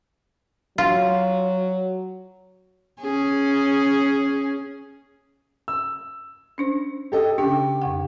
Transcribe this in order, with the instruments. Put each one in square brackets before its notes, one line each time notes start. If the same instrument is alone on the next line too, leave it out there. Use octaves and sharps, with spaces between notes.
[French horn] F#3 [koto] F4
[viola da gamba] C#4 G#4
[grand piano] E6
[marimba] C#4 D4 C5
[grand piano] G4 A4 D#5
[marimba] C#3 C#4 D4 [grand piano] G4
[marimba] F2 C3 F#5